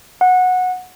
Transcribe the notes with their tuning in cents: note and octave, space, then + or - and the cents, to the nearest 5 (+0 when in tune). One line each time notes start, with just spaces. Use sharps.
F#5 -15